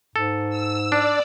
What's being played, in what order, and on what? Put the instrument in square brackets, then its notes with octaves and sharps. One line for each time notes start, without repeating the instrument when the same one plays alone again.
[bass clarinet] G#2 [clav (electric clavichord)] A4
[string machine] E6
[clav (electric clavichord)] D4 [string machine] D5